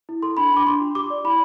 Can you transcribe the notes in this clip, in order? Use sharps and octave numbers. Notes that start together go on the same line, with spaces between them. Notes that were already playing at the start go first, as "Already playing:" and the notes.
E4
A4 C6
D4 B5
D4 D6
D4 C6
F4
G4 D6
D5
E4 B5